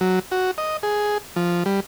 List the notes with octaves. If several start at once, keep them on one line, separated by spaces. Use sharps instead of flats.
F#3
F#4
D#5
G#4
F3
G3